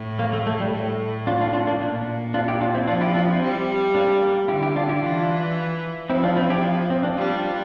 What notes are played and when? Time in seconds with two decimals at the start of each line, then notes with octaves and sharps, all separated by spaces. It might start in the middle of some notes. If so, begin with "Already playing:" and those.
Already playing: A2
0.19 A#3
0.33 A3
0.47 A3
0.60 G3
0.73 A2 A3
1.27 D4 F4
1.41 D4 F4
1.53 D4 F4
1.67 A#3 D4
1.80 A#2 A#3 D4
2.34 D4 F4
2.48 E4 G4
2.61 D4 F4
2.74 C4 E4
2.87 F3 D4 F4
3.01 E4 G4
3.14 D4 F4
3.28 C4 E4
3.42 G3
3.95 A#3 D4
4.22 A#3
4.48 D3 E4 G4
4.62 E4 G4
4.76 D4 F4
4.89 E4 G4
5.02 E3 D4 F4
6.10 F3 C4 E4
6.23 D4 F4
6.36 C4 E4
6.50 E4 G4
6.63 D4 F4
6.90 C4
7.03 A#3 D4
7.17 G3 D4 F4